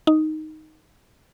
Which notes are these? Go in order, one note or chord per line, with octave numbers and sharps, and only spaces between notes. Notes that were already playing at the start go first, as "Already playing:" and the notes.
D#4